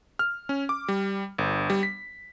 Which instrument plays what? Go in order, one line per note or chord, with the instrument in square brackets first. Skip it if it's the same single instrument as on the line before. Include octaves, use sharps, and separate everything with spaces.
[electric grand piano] F6
C#4
D6
G3
G1
G3
B6